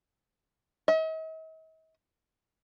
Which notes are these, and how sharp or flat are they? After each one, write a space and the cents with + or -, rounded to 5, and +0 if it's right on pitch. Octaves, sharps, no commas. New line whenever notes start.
D#5 +45